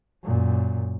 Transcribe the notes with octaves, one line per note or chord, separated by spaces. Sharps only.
F#2 A#2